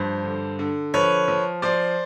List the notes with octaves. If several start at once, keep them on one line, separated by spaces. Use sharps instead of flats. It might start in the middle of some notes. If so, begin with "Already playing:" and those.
Already playing: G2 F3 C5
D3
D3
F3 B4 C#5
F3
F3 C5 D5